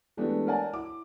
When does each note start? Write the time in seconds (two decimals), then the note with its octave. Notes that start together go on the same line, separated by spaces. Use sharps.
0.17 E3 G#3 A3 B3 D4 G4
0.47 A#4 C#5 D5 F#5 G#5 A5
0.73 E4 D6